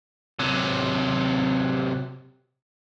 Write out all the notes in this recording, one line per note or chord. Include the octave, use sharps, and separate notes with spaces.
C3 F#3